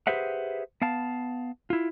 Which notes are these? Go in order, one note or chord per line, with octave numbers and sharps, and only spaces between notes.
G4 G#4 B4 C5 E5 F#5
B3 F5 A5
E4 F4